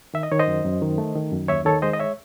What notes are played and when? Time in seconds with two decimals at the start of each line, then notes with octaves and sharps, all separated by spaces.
0.14 D#3 E5
0.23 D#5
0.31 D#3 C#5
0.40 C5 D#5
0.47 F#2
0.65 F#2
0.82 D#3
0.98 A3
1.16 D#3
1.32 F#2
1.48 D#2 C#5 E5
1.65 D#3 A4 C#5
1.82 G#3 C5 D#5
1.93 D#5
1.99 C#5 E5